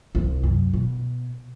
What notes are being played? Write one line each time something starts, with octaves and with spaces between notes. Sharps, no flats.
C2
F#2
B2